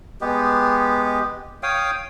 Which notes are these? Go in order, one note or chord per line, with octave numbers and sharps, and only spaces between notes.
G#3 B3 G4
C#5 F5 G5 D#6